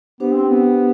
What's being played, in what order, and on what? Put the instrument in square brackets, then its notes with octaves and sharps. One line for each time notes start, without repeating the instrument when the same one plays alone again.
[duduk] B3 [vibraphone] D4 G4 C5
[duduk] C4
B3